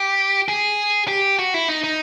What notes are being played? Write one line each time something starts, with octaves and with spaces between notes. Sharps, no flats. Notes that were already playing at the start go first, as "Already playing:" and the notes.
Already playing: G4
G#4
G4
F#4
E4
D#4
D#4